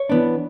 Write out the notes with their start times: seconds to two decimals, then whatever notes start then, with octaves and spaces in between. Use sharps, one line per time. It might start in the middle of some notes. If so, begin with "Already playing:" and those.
Already playing: C#5
0.09 E3 B3 D4